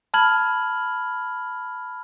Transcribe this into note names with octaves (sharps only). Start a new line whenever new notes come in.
A5 B5 F6 G#6 F#7